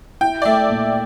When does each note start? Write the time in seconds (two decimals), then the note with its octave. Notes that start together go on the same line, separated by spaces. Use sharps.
0.21 E4 G5
0.42 D5
0.45 A3 E5
0.70 A#2